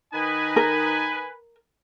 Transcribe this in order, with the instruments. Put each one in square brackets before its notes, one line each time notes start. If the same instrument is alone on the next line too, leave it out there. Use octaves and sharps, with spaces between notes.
[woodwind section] D#3 D#4 D#5 [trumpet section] B4 G#5
[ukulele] A#4